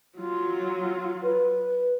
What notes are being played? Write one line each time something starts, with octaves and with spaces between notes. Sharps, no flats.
F#3 F4
B4